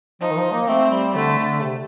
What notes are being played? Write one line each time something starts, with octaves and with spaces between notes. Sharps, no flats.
F3 D#4
D#3
F3
A#3
A3 C4
G3
D3 A3
D3
C3